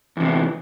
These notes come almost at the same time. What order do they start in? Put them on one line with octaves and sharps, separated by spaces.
E2 C3 E3